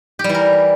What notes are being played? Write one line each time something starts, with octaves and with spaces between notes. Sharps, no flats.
G4
G3
E3
A#4